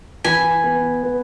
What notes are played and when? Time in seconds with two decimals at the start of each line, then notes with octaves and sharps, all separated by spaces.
0.24 E3 G#5 B5
0.64 B3
1.03 B3